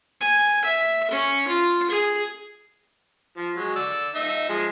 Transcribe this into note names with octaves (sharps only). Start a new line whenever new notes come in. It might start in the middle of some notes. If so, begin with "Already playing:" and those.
G#5
E5
C#4
F4
G#4
F3
F#3 G#3
D5 E6
D#4 E5
F3 G#3